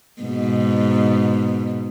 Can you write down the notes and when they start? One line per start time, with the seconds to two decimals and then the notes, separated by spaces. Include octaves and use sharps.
0.21 G#2 B2